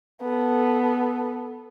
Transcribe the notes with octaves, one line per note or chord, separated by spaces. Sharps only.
B3 A4